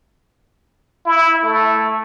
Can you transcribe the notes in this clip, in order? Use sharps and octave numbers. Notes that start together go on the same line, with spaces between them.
E4
A3